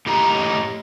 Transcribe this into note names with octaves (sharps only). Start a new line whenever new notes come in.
A2 G4 D#5 A#5